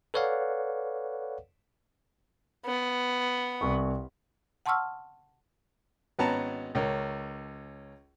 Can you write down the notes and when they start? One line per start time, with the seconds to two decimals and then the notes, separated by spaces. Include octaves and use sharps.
0.14 A4 B4 C#5 D5 F5 F#5
2.66 B3
3.61 C2 C#6
4.66 F#5 A5 C6 C#6 E6 F6
6.19 G#1 B3 C#4 B4 A5 A#5
6.75 C#2 C#4 A#4